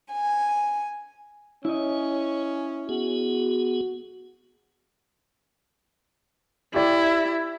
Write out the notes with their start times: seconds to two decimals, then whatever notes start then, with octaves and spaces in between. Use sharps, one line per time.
0.11 G#5
1.65 C#4 E4 C#5 D#5
2.89 B3 F#4 G#4
6.74 E4 G4 D5